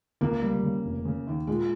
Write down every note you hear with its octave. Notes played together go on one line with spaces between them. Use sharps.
C#2 A#3
G3
C#3
F1
C#3
D#2
A#2 G#3